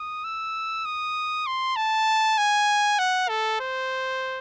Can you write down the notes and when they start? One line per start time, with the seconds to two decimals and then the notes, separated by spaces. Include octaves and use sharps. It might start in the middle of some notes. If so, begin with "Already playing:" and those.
Already playing: D#6
0.24 E6
0.85 D#6
1.46 C6
1.76 A5
2.38 G#5
2.99 F#5
3.29 A4
3.60 C5